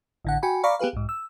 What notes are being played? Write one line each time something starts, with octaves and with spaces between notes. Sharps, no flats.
A1 D3 F#5
F#4 G5 G#5 B5
D5 F5 A#5 B5 C#6 D6
B3 G4 G#4 B4 F5
B1 G#2
E6